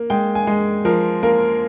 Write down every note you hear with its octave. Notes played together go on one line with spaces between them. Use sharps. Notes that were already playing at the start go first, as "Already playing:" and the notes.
Already playing: A#3
G#3 G5
G#5
G#3
F3 A#4
A#3 A#4